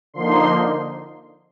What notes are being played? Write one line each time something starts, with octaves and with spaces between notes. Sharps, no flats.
D3 F3 A#3 D#4 C6